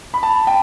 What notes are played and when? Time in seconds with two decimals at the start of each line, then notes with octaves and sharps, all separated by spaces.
0.14 B5
0.23 A5
0.47 G5